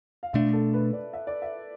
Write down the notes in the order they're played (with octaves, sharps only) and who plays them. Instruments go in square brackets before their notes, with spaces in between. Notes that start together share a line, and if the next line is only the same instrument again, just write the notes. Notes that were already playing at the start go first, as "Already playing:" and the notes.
[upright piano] F5
[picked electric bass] B2 A3 D4 [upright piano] E5
[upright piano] A4
B4
D5
E5
D5
E5